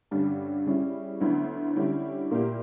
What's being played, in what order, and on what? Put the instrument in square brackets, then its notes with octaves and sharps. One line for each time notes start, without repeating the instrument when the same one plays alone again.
[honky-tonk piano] G2 D3 G3 C#4
C#3 G3 C#4 E4
D2 D3 F#3 B3 E4
D3 G3 C#4 E4 G4
A#2 A#3 E4 G4